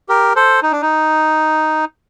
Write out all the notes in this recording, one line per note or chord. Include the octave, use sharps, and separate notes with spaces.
G4 A#4
A4 C5
D#4
D4
D#4